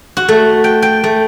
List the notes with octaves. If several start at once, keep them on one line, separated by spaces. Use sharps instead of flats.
F#4
A3
G5
G5
A3